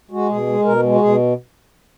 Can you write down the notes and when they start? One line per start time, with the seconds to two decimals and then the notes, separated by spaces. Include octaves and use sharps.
0.11 G#3 F#4
0.29 B2 G#4
0.47 G#3
0.64 B2 A#4
0.83 G#3
0.95 F#4
1.00 B2 G#4